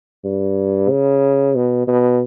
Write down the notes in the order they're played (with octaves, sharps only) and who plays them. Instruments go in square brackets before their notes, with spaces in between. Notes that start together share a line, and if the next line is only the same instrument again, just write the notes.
[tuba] G2
C#3
B2
B2